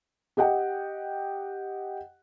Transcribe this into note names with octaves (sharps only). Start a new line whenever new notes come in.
G4 D#5 F#5 G5